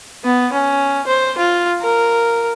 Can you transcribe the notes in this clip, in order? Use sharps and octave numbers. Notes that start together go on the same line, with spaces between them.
B3
C#4
C5
F4
A#4